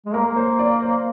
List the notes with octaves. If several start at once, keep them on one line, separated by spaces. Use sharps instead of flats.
G#3
A#3 A#4
C5
D5
C5